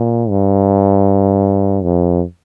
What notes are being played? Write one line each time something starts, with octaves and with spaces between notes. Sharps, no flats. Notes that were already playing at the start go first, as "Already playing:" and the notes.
Already playing: A#2
G2
F2